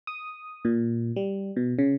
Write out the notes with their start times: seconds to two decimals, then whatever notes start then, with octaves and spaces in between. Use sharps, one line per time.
0.07 D#6
0.65 A#2
1.16 G3
1.57 B2
1.78 C#3